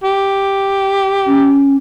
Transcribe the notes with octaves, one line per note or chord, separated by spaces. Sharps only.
G4
C#4